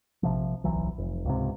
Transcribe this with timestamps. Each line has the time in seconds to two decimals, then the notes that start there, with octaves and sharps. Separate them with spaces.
0.23 A#1 C3 F3
0.64 D1 B1 E3 F#3
0.98 F1
1.25 C#2 G#2 C3